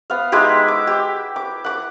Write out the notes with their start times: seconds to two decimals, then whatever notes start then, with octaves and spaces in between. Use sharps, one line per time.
0.10 B3 F5
0.32 G#3 D#4 E4 G4
0.68 D6
0.87 G4
1.36 D6
1.64 F#5 D6